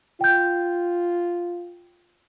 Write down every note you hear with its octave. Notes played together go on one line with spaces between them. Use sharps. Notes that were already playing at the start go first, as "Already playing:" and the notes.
F4 G5 G6